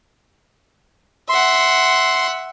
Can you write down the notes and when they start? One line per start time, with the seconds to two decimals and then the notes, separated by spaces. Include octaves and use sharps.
1.29 E5 F#5 C6